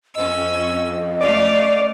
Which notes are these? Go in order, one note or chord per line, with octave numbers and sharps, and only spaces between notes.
F2 C#4 D#5 E6
A3 C#4 D5 F5